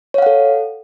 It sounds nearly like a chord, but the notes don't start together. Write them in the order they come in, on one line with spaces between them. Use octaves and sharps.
C#5 F5 F#5 A4